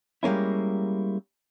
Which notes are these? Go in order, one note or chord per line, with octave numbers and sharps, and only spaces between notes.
G3 G#3 A#3 C#4 E4